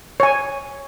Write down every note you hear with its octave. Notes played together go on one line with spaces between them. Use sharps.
C#5 G#5